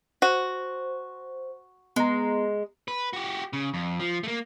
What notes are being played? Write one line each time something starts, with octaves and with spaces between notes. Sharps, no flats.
F#4 C5
G#3 B3 A#5
B4
F#4 G4
C#3
F2
F3
A3 A#3